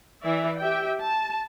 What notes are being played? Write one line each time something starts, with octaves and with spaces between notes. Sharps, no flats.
E3 D5 E5
G4 E5 G5
A5